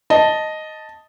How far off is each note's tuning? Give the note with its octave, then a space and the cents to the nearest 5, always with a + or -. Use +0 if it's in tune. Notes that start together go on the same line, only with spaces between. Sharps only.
D#5 +0 A5 +0